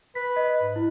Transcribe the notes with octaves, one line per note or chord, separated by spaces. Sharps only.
B4 B6
D#5
G#2
E4